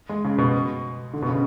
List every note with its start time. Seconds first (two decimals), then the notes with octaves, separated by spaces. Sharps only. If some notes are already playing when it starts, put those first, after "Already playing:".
0.09 G#3
0.25 C#3
0.38 B2
1.13 D3
1.22 B2
1.29 C#3